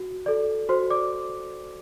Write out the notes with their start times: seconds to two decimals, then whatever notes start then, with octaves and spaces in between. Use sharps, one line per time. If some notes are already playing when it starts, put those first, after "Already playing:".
Already playing: F#4
0.26 A4 D5
0.69 F#4 C5 C6
0.90 D5 D6